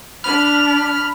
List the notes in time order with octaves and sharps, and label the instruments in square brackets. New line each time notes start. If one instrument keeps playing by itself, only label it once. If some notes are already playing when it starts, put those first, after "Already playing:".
[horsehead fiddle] D4 [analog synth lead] B5 [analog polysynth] F6